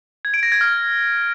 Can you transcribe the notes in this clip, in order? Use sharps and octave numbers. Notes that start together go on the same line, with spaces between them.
G#6
D7
A#6
G#6
F6